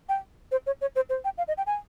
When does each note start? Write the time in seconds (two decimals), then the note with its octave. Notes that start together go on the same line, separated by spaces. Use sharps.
0.09 G5
0.52 C5
0.67 C#5
0.81 C#5
0.96 C5
1.09 C5
1.25 G5
1.38 F5
1.48 D#5
1.58 G5
1.67 G#5